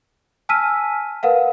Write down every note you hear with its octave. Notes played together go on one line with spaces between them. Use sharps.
G#5 A5 E6 F6 B6 D#7
A#4 B4 F5 F#5